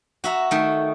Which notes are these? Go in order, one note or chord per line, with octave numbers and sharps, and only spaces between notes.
F#4 E5 A#5
D#3 A3